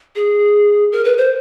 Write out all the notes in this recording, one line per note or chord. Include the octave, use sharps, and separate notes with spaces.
G#4
A#4
B4
C5